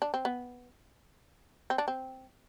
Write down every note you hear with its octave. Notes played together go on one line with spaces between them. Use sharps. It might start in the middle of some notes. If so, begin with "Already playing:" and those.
D4
C4
B3
C4
D4
C4